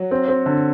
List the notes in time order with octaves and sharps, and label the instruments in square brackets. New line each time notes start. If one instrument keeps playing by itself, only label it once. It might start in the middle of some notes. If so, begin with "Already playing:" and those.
Already playing: [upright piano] F#3 F#4
[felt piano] C4
C4
D3